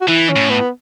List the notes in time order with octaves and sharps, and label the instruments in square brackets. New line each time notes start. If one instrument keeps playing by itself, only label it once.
[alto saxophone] F#4
[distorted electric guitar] E3 [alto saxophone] E4
[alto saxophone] C#4
[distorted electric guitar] A2
[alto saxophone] B3